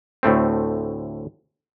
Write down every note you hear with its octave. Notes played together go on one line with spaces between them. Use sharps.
D2 A2 A3 C4